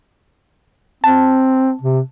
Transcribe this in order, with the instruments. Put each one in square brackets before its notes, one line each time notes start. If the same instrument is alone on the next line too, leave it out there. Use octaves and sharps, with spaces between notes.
[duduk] C4 [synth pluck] A5
[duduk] C3